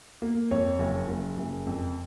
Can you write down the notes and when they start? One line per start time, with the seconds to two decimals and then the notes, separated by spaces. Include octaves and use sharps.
0.22 A#3
0.51 F2 C#5
0.79 F#1
1.08 F#1
1.38 F#1
1.66 F2